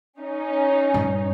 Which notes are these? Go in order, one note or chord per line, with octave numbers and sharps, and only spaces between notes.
C#4 D#4
G2 A#2